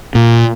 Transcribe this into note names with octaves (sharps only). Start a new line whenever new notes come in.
A#2